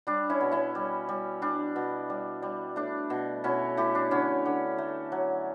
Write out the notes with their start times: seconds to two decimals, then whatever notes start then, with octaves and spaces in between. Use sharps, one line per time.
0.07 G3 D4
0.30 C#4 E4
0.41 B2
0.52 C#4 E4
0.75 G3
1.09 G3
1.42 G3 D4
1.76 B2
2.10 G3
2.42 G3
2.76 A3 D4
3.10 B2
3.44 B2 C#4 E4
3.77 A3 E4 G4
3.95 D4
4.11 D3 C#4 E4
4.46 D3
4.78 A3
5.12 F#3